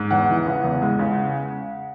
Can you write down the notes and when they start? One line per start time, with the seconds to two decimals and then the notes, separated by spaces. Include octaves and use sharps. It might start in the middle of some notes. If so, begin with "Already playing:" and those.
Already playing: G#2
0.11 E2 F#5
0.29 E3
0.46 C#3
0.64 E2
0.82 G#3
0.99 C#3